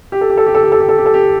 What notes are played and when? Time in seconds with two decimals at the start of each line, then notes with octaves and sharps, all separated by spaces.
0.12 G4
0.21 A4
0.30 G4
0.37 A4
0.47 G4
0.55 A4
0.64 G4
0.72 A4
0.80 G4
0.89 A4
0.97 G4
1.06 A4
1.14 G4